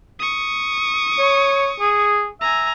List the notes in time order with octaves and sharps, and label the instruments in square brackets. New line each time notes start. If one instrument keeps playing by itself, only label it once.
[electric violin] C#6 D#6
[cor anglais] C#5
G#4
[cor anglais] E5 [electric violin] G#5 A#5